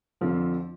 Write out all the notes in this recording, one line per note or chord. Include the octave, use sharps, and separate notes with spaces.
F2 D3 F3 C4